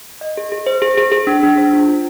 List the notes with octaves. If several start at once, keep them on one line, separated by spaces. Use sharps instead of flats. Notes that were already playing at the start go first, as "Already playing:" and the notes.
D#5
G#4
G#4
C5
G#4
G#4
G#4
D4
D4
C5
F4
F4